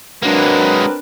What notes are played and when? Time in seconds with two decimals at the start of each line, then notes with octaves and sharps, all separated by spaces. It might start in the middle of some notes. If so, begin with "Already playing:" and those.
0.23 F#3 G#3 A#3 C4 D4 A#4 B4